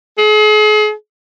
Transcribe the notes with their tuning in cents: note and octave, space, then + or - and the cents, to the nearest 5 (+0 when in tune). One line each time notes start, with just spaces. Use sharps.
G#4 +40